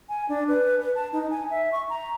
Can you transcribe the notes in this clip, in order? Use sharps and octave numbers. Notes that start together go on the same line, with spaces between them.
G#5
D4
B4
B4
A5
D#4
G#5
E5
C#6
A#5